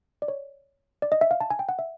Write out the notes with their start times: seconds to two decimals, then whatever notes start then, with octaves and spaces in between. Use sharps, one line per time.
0.22 D5
0.28 C#5
1.02 D5
1.12 D#5
1.21 E5
1.31 F5
1.40 A5
1.50 G#5
1.59 G5
1.69 F#5
1.79 E5